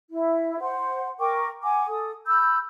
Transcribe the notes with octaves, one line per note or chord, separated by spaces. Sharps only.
E4
C5 F#5 C6
A#4 G5 C#6 D6
F#5 G#5 D6
A4 D#6
B5 E6 G6